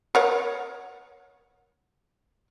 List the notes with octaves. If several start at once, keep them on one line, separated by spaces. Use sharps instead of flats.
A#4 C#5 F#5